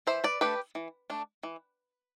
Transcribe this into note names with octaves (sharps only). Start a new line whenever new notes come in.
E3 C5 E5
B4 D5
A3 D4 G4 B4
E3
A3 D4
E3